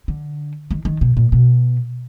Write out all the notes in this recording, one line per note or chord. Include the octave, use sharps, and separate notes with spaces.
D3
D#3
D#3
B2
A#2
B2